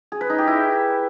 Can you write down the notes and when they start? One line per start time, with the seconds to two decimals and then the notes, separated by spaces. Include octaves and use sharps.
0.12 G#4
0.21 B4
0.30 D#4
0.38 G4
0.47 E4